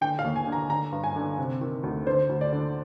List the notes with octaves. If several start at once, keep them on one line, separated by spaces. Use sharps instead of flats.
D3 G5
F5
D#2
G#5
D3
A#5
D3 A#5
G2
G#5
D3
C3
D#3
D2
D3 C5
D2
D5
D3